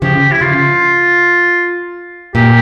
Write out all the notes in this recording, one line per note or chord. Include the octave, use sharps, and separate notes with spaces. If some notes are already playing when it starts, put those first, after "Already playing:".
C#3 F3 G4
E4
C#3 F4
A#2 G4